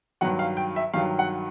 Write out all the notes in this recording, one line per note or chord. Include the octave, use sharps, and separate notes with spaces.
G2 D#3 F#3 F#5
F5
G5
E5
G2 D#3 F#3 F5
F#5